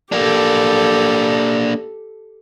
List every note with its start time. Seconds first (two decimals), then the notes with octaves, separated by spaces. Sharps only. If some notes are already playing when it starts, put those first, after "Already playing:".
0.12 A#3 D4 G4 A4